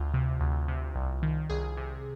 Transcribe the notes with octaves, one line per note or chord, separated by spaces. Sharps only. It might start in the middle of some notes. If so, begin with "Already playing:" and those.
Already playing: D2 F4
C3
D2
C3
C2
D#3
C2 G#4
C3